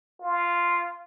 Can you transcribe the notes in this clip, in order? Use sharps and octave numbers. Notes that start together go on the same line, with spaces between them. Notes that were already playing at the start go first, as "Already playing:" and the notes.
F4